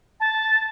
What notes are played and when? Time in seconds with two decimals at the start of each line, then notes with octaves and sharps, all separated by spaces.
0.20 A5